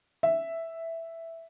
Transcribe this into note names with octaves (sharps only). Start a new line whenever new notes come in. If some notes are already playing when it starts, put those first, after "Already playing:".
E5